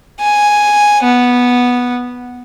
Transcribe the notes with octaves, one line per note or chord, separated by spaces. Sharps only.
G#5
B3